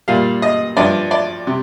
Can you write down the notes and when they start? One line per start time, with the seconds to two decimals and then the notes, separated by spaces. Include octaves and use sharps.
0.08 A#2 G3 F5
0.42 D#5
0.77 G2 F3 D5
1.11 D5
1.47 C3